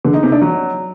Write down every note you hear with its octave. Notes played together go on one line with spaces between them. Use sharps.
D3
D#4
C3
D4
F#3